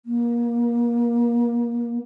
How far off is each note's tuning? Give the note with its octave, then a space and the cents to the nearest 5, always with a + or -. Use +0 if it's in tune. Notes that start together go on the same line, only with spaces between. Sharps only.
A#3 +25